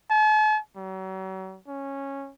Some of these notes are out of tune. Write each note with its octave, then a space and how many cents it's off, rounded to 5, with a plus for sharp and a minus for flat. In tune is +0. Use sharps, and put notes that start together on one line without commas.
A5 -45
F#3 +40
C#4 -10